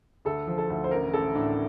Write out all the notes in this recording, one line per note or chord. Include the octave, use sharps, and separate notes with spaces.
D2 A4
F3
A4
D2
C5
A1 A#4
A1 A4
A2 D4